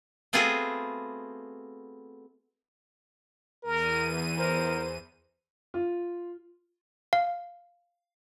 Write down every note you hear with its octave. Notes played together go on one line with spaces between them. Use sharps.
A3 B3 C4 F4 F#4 G#4
E2 A#4 D#7
A#4 C5
F4
F5